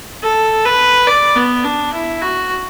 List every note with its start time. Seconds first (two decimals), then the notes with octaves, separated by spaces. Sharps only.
0.22 A4
0.65 B4
1.07 D5
1.36 B3
1.64 D4
1.93 E4
2.21 F#4